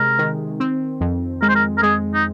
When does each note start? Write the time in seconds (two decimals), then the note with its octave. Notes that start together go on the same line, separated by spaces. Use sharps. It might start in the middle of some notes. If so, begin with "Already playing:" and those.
Already playing: C3 G#3 A#4
0.19 D#3
0.60 C4
1.01 F2
1.42 G#3 A#4
1.49 C5
1.56 A#4
1.78 A#4
1.82 G#3 G#4
2.14 D#4